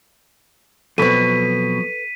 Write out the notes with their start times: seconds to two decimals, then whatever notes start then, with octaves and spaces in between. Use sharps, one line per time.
0.98 B2 F3 F#3 C4 A4 B4 B6 D#7